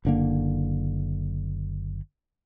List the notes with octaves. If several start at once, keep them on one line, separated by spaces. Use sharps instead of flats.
F#1 D3 A#3